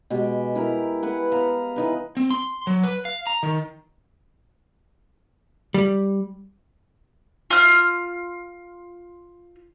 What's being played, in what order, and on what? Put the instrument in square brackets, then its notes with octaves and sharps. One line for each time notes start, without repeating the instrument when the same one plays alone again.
[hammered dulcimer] B2 G#3 G4
E4 A#4 A#5
B4 F#5 G#5
B3 F5 A#5
E3 D#4 B4
[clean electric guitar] C4
C6
F#3
B4
F5
A#5
D#3
[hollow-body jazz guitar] G3
[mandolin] F4 F6